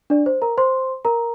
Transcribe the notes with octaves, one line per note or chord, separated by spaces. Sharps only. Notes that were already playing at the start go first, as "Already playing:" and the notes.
D4 D5
C5
A#4 A#5
C5 C6
A#4 A#5